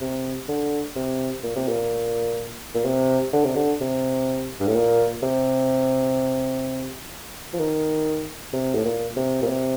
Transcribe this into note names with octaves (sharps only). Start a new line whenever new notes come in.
C3
D3
C3
A#2
C3
A#2
A#2
C3
D3
C3
D3
C3
G2
A2
A#2
C3
F3
D#3
C3
A2
A#2
C3
A#2
C3